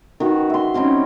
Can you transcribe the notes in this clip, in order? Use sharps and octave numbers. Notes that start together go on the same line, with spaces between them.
D#3 F#4 B4
E5 C6
G3 C4 C#4 D#4